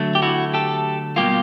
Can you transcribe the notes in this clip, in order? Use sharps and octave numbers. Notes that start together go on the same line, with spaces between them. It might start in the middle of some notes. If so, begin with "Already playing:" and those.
Already playing: D3 F#3 A3
G4
E4 F#4
G4 A4
B2 G3 A#3 F4 G4